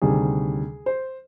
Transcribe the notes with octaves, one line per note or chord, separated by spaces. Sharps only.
D2 C3 D#3 G3 G#4
C5